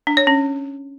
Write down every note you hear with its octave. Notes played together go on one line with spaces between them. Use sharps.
D4
C#5
C#4